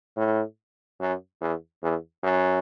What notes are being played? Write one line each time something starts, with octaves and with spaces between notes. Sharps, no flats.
A2
F#2
E2
E2
F#2